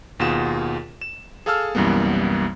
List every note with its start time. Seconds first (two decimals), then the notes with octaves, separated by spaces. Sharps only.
0.20 D#2 B2 F4 G#4 F#5 E7
1.01 E7
1.46 G#4 A4 F5 A5 E6 F6
1.75 C2 F#2 E3 G3 A#3 B3